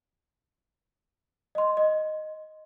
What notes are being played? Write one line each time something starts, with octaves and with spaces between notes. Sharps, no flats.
D#5 C6
D#5